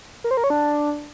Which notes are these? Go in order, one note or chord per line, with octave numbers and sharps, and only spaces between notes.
A#4
C5
A#4
C#5
D4